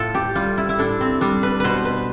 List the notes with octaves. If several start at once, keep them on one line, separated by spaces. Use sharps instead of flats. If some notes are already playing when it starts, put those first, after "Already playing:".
Already playing: A2 F4 A4
G4
G3 F4
E4
E4
A2 D4
C4
G3 D4
B4
B2 B4 C5
B4